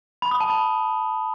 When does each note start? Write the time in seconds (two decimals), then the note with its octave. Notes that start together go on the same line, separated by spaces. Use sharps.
0.22 B5
0.31 D#6
0.40 A5
0.50 B5